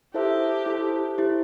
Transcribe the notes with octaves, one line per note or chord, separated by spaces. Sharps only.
E4 G4 A4 C5 E5 A5
E4 A4 C5 E5 A5
E4 G4 C5